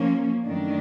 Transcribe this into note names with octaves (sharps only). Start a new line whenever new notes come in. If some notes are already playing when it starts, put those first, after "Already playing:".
Already playing: F3 A#3 C#4
F#2 D#3 F#3 A3 D4